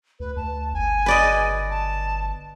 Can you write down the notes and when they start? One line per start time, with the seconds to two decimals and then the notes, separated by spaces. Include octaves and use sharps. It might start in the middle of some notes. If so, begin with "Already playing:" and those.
0.20 D2 B4
0.36 D2 A5
0.74 G1 G#5
1.06 B4 D5 D#5
1.71 A5